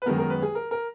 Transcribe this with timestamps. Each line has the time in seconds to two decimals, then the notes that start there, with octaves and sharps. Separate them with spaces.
0.02 B4
0.06 F#2 D#3 G#3 B3 A#4
0.18 A#4
0.30 B4
0.42 G#4
0.55 A#4
0.71 A#4